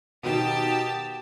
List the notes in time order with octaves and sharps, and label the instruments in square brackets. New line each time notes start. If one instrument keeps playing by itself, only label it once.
[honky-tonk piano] B2 D#3 [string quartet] G4 A5